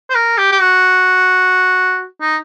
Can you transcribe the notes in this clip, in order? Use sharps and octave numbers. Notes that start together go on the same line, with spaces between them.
C5
A#4
G4
G4
F#4
D#4